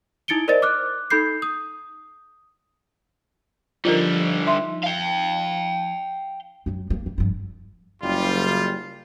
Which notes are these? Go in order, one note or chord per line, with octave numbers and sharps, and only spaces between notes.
D#4 E4 A6 C#7 D7 G7
A#4 C5 D5 D#5 A6
D6 F6 F#6
D#4 A4 B5 G6 C7
D#6
D3 F3 G3 D#4 F4 A#4
E5 C6
F5 G5
F#2 F#3
G#3 A#3
E3
G2 F3
F#1 G3 F4